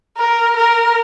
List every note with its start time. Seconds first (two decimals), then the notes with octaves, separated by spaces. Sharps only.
0.17 A#4
0.57 A#4